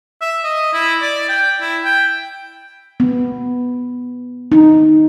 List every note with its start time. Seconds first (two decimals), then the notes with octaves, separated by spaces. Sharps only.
0.21 E5
0.44 D#5
0.74 E4
1.02 D5
1.29 G5
1.61 E4
1.85 G5
3.00 B3
4.52 D#4